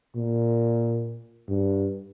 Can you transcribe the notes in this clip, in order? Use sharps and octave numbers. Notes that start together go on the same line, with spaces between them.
A#2
G2